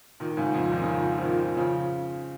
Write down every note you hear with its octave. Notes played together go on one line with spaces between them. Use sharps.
A#2 D#3
A#2
G#2 C#3
F2 A#2
A#2 D#3
C#3
A#2 D#3
F3
A#2 D#3
C#3 F3